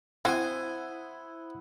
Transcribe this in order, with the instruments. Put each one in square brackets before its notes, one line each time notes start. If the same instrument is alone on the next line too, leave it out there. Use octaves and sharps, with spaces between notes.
[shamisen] C4 F#4 [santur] E4 F#5 D#6 [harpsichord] C5 G#5